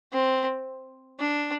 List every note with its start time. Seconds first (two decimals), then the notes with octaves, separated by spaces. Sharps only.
0.12 C4
1.19 D4